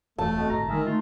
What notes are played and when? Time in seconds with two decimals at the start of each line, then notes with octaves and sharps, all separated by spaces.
0.18 E1 E2 A3 A5
0.36 F2 B2 B3
0.50 G#1 A2 A#5
0.68 D3 D#3 G#3 G#4 A#4 E5
0.86 A3 D#4 F4